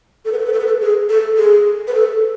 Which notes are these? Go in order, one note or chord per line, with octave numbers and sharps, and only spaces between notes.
A4
B4
A4
B4
A4
B4
A4
G#4
A4
G#4
B4
A4